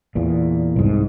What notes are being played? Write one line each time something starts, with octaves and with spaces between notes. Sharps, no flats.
E2 A#2
C2 G#2